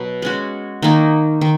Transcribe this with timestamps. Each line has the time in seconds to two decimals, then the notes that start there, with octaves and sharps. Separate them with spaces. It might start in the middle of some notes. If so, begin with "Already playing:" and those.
Already playing: B2 F#3 B3
0.22 G#3 C#4 F#4
0.82 D#3 A#3 D#4
1.41 D#3